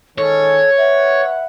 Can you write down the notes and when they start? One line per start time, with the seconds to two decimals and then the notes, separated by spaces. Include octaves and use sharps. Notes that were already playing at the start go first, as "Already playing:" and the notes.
0.18 D#3 G#3 C#4 A4 C#5
0.77 B4 E5 F#5